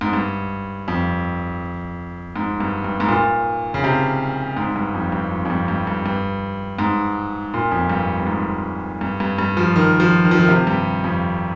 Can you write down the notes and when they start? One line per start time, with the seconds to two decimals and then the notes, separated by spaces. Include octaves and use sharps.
0.01 G#2
0.13 G2
0.88 F2
2.36 G#2
2.60 G2
2.84 G2
3.00 G#2
3.09 A#2
3.74 C#3
3.84 C3
4.57 G#2
4.76 G2
4.94 F2
5.12 G2
5.31 F2
5.45 F2
5.50 G2
5.68 G2
5.87 G2
6.06 G2
6.79 G#2
7.54 A#2
7.71 F2
7.90 G2
8.20 G2
8.27 G#2
9.01 G2
9.20 G2
9.38 G2
9.57 F3
9.76 D#3
10.00 F3
10.25 D#3
10.31 F3
10.39 D#3
10.48 C3
10.67 G2
11.04 F2